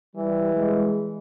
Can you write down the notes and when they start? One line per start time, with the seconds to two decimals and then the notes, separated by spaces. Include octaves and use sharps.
0.16 E3 G3
0.55 G#3